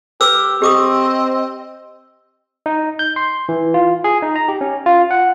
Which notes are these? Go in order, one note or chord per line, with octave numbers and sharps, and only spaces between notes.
G4 B4 D6 E6
C4 G4 D#5 D6 D#6
D#4
G6
C6
E3
F4
G#4
D#4
A#5
G4
C#4
F4
F#5